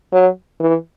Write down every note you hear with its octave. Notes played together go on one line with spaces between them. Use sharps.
F#3
E3